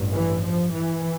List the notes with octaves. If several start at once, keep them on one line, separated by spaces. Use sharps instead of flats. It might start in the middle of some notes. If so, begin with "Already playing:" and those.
Already playing: A1 G2
E3
F3
E3